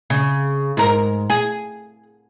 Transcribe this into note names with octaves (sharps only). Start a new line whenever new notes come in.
C#3
G#2 A#4
G#4